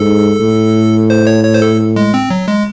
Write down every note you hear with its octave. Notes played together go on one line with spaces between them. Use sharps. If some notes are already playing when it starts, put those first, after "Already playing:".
Already playing: G#2 A4
A2
C5
C#5
C#5
C5
A4
G#3
C4
F#3
G#3